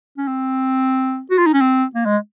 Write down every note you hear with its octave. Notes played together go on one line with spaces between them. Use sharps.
C#4
C4
F#4
F4
D#4
C#4
C4
A#3
G#3